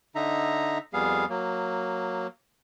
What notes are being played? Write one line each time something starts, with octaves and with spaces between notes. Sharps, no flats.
D3 D#4 E5 A#5
F2 G3 B3 G#4 F5
F#3 A#3